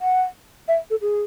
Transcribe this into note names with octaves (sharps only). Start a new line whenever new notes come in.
F#5
E5
A4
G#4